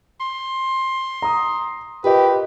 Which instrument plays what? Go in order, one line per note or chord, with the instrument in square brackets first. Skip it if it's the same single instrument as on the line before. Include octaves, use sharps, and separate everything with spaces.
[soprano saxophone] C6
[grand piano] A#5 D#6
[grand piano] F4 A#4 D#5 [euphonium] G4 [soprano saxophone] B4